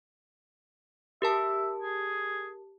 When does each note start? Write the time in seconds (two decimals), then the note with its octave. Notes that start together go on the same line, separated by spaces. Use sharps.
1.22 G4 A#4 E5 A5
1.82 G#4